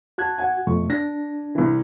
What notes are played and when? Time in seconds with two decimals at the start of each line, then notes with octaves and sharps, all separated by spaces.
0.18 F#4 A5 F#6 G#6
0.38 F#5 G#5
0.67 F2 B2 A3 C#6
0.90 D4 A#6
1.55 C2 E3